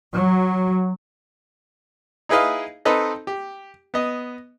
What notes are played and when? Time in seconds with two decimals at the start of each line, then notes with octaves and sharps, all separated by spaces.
0.14 F#3
2.29 D#4 E4 G#4 B4 D#5 F5
2.85 C4 D#4 A4 B4 D#5
3.27 G4
3.94 B3 D#5